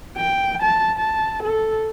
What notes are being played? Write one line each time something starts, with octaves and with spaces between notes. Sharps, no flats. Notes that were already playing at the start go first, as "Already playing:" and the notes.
G5
A5
A5
A4